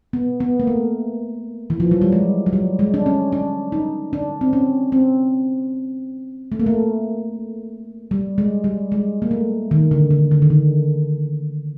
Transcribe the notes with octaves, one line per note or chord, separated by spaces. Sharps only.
B3
B3
A#3
A3
E3
F3
F#3
G3
G#3
F#3
G3
G#3
D4
C#4
D4
D#4
D4
C4
C#4
C4
A3
A#3
A3
G3
G#3
G3
G#3
A#3
A3
D#3
D3
D3
D3
D#3
D3